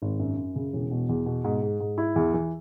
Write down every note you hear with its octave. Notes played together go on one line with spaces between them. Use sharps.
G#1
F#2
F#2
C#3
E1
B2
E2
B2
G#2
G#2
G#2
E4
E2
E3